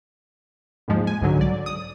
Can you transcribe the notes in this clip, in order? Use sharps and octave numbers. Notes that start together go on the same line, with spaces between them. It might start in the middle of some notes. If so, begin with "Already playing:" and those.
D#2 G#2 F3 G#3
G#5
C2 G#2 D3 F#3
D5
D#6